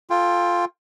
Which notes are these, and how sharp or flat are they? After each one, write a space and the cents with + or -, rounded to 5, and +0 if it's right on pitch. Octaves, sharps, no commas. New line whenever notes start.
F4 +5 A4 +0 G5 +25